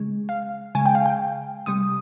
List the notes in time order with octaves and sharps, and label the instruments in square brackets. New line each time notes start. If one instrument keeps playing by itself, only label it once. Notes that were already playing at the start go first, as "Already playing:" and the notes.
Already playing: [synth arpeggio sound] C#3 G#3
F5
C#3 G#3 G#5
G5
F5
G5
C3 G3 D#6